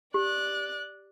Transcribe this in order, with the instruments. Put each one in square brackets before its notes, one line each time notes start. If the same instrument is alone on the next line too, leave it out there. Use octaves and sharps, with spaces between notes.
[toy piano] G4 [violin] D5 F#6